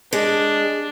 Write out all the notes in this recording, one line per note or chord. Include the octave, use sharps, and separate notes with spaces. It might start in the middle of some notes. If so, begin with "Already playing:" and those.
G#3 D4